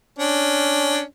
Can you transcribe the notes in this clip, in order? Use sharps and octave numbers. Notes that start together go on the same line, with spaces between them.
C#4 D4